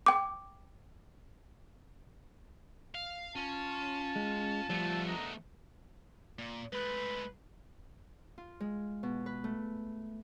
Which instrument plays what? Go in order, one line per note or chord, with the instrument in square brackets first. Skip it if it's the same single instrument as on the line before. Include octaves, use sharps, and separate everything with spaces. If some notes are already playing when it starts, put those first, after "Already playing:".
[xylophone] G5 D6
[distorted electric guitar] F5
[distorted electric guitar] C#4 [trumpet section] F4 A5
[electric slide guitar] G#3
[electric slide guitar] F3 G3 [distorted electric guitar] A3 B3
[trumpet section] D4 D#5 A#5
[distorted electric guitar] A#2
[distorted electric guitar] G#3 A3 [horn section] B4
[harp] F4
G#3
B2
B4
A3